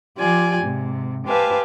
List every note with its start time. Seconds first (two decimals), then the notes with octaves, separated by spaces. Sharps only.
0.18 F3 F4 G4 D5 G#5
0.62 G#2 C3
1.26 G4 B4 C5 F5 G#5 A5